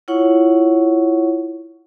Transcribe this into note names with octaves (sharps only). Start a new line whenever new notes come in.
E4 F4 C#5 F#5 C#6